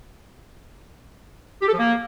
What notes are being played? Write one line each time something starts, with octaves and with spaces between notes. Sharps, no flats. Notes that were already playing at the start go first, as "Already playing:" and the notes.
G4
A4
F3
A#3